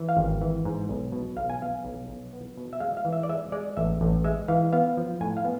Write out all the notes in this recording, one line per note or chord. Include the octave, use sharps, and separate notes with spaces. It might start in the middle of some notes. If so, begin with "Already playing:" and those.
Already playing: E3
F5
G#1
E3
G#2
B1
B2
B1 F5
G#5
B3 F5
B1
B1
B3
B2
E5
G#3 F5
F5
E3
E5
D5
G#3 E5
G#3 D5
A1 E5
A1
G#3 E5
E3 F5
B3 F5
F3
A2 G#5
F5
B3